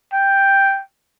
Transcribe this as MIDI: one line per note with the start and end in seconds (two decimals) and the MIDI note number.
0.13 0.81 79